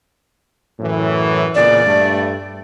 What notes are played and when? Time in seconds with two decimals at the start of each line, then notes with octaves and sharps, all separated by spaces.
0.80 F#2 A2 E3
1.55 E2 A#2 C#3 D5
1.85 G2 A3